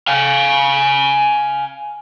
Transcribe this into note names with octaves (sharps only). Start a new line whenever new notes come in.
F5 G#5